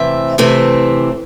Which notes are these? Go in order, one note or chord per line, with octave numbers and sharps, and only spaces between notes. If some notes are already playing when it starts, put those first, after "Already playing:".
Already playing: C3 E3 A3 C4 E5
C3 E3 A3 C4